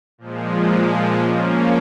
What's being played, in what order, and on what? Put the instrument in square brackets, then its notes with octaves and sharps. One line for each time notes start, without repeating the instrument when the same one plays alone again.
[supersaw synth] A#2 F3 G#3
F3 A#3 C#4